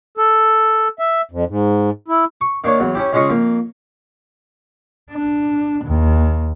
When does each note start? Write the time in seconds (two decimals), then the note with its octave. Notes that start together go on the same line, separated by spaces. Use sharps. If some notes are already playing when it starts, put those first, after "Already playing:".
0.17 A4
0.99 E5
1.32 F2
1.49 G#2
2.08 E4
2.41 C#6
2.64 D#3 A#3 D4 C#5
2.80 E2 F#3
2.95 C#4 E4 G4
3.13 C#2 G#3 C#4 F4 D#5 C#6
3.30 F2 A#3
5.12 D4
5.84 D#2